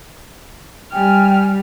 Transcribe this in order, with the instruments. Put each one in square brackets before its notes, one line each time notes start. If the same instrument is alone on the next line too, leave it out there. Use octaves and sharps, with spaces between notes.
[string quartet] G3 [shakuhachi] G5 [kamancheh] G#5 F6